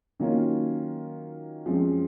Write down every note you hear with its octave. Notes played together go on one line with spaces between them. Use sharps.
D#3 F#3 A#3 C#4 F4
F#2 F3 G#3 C4